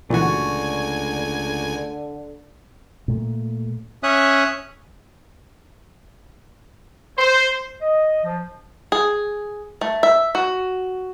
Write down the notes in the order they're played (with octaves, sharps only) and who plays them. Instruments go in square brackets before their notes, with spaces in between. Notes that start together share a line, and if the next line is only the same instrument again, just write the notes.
[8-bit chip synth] C#2 G#5 [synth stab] A#2 E3 F#4 [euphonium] D3 [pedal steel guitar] A3 C#6
[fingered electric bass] A#2 A3
[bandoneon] C#4 C#5 E5 D#6 F#6
[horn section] C5
[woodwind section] D#5
F3
[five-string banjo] G#4
A3
E5
F#4